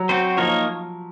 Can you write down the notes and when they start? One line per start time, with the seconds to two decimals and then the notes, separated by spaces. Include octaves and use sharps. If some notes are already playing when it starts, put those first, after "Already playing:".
Already playing: F#3
0.09 C4 F#4 C5
0.37 F3 A#3 D#4 A#4 C#5